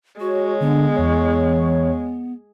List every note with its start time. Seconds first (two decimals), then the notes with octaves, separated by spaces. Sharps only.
0.20 G#3 F#4 C#5
0.61 D3 B3
0.96 E2 C#5